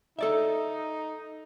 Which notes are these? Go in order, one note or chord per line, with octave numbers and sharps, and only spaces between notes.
D#4 A4 D5 E5